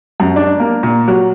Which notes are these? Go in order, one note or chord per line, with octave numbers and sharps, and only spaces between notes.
F#2
D4
A#3
A#2
F#3